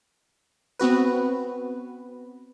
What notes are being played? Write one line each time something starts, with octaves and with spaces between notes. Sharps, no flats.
B3 C4 F#4 B4